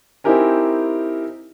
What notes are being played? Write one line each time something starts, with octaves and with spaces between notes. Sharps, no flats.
C4 D#4 E4 G4 A#4 G#5